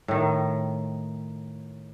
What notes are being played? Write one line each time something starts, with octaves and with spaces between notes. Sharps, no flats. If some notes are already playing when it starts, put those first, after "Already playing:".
A2 D#3